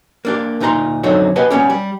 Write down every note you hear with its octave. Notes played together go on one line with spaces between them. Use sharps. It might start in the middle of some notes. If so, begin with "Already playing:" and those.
A#3 D4 G4
D2 A#2 D#4 A4 A#5 C6
F#2 D3 F#3 C4 D#4 F#4
G4 B4 D#5 F#5 G#5 A5
G3 B3 C#4 G4
G3